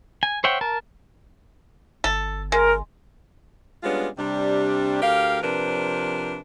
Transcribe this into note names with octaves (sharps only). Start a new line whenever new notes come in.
G#5
C5 C#5 E5 F#5 G5
A#4 A5
G1 A4
G#3 A#4
G3 G#3 B3 C#4 D4 F4
C3 G3 D4
D2 G4 A#4 F5
C3 F3 D4 A#4 B4